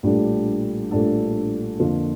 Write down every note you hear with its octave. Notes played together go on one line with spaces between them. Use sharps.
A#1 A2 G3 D4 A4
A#1 A2 G3 D4 A4
F2 D3 F3 A#3 F4